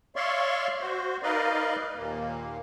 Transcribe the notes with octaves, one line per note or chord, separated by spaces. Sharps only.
C#5 D5 E5 F5 C6 C#6
F#4 C5
D#4 A#4 B4 D5 D#5 F5
D#2 A#2 A#3